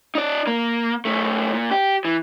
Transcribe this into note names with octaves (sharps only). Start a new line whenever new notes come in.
D#4 D5
A#3
F#2 A3
A#2
G4
E3